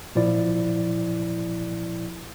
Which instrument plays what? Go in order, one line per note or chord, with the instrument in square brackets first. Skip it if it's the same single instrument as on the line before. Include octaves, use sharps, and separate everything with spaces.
[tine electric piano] A#2 F3 E4 D5